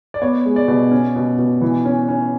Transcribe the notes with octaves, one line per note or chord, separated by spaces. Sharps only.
D5
B3 C#5
G#3
D5
B2
C#4
B2
B2
E3
C#4
C#4